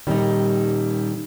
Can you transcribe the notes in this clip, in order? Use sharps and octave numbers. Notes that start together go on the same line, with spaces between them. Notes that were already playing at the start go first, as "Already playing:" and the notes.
D#1 D#3 G3 D#4